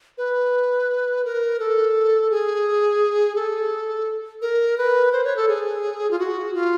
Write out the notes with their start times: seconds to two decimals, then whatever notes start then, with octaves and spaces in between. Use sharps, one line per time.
0.18 B4
1.25 A#4
1.60 A4
2.30 G#4
3.36 A4
4.42 A#4
4.78 B4
5.12 C5
5.24 C#5
5.36 A4
5.48 G#4
6.11 F4
6.19 F#4
6.54 F4